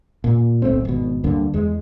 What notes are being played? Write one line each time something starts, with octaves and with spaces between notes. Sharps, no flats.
A#2
D1 B1 A3 C4
G#1 B2
D2 G2 D3 A#3
E2 G#3